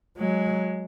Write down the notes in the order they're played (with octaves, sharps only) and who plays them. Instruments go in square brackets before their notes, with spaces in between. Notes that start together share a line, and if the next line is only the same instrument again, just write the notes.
[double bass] F#3 [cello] G#3